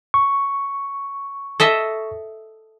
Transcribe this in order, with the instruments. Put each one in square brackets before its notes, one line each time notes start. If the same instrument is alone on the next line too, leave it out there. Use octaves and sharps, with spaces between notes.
[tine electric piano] C#6
[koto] A4 D#5 E5